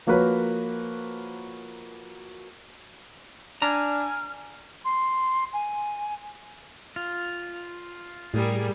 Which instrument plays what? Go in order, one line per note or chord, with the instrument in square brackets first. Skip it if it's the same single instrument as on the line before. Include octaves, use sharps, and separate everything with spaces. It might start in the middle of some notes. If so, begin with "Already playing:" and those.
[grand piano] F3 A#3 F#4 A#4 B4 C#5
[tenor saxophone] D4 [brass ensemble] G#5 [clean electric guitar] A#5 [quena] F6
[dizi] C6
G#5
[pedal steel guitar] F4
[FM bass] A2 [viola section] G3 G#4 A#4